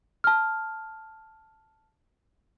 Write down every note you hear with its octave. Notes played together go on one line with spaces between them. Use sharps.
A5 F6